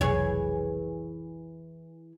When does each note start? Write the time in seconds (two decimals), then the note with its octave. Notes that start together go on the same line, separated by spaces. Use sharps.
0.01 F1 B1 E3 G#4 C#5